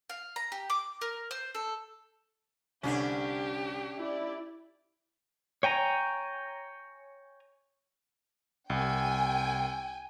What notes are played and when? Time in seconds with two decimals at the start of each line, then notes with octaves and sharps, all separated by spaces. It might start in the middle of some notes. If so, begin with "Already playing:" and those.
0.10 F5
0.36 A#5
0.52 G4
0.70 D6
1.01 A#4
1.31 C5
1.55 A4
2.83 C2 D3 C#4 D4 G4
3.98 E4 D5
5.63 C#5 G5 G#5 A#5
8.70 C2 G5 G#5